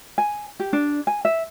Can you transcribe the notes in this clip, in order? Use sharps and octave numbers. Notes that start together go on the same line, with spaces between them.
G#5
G4
D4
G#5
E5